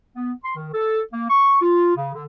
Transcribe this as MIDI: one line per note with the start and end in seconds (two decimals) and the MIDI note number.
0.16 0.33 59
0.44 0.52 84
0.56 0.68 51
0.74 1.00 69
1.12 1.30 58
1.30 1.60 85
1.62 1.95 65
1.95 2.11 49
2.14 2.23 50